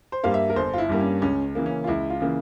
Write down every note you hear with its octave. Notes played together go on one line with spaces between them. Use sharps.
C5
G2 G3 A#3 F5
E5
A#4
G1 C5
F4
E4
G2 G3 A#3
C#4
C#2 C#4
C#3 E3 A#3
C#4
F4
C#2 E4
F4
C#3 E3 A#3